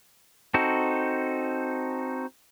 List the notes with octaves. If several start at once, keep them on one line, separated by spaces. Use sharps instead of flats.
C4 D#4 F#4 A4